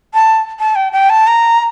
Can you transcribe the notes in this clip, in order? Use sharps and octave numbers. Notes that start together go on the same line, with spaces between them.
A5
A5
G5
G5
A5
A#5